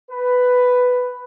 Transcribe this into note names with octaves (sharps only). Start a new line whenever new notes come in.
B4